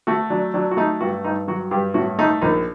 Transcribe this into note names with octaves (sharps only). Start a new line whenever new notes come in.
A3 F#4
F#3 D4
F#3 D4
F#4
A3 D#4
G2 F#4
G2 D#4
F#3 F#4
G2 G4
A2 F#4
A3 D#4
A#1 D#4